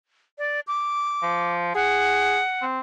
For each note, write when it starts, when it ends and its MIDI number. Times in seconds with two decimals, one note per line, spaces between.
0.38 0.60 74
0.67 1.54 86
1.23 1.74 53
1.75 2.39 68
1.75 2.65 78
2.62 2.81 60